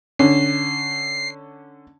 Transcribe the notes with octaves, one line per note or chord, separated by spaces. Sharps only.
D3 C#4 C7